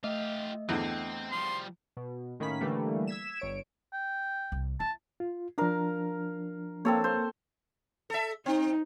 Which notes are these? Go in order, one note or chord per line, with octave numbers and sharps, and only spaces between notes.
A3 F4 G4 D#5 E5
E2 D3 C4
F3 G3 C6
B2
A2 D#3 A#3 C#4 B5 B6
D3 E3 G3 A3 A#3
E6 G#6 B6 E7
G1 C#5 D7
G5
C2
E4 A5
F4
F3 D4 A#4 F5 A#5
A#3 C4 A4 C#5
C5
A4 E5
C4 D#4